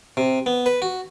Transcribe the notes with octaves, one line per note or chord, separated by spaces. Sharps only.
C3
B3
B4
F#4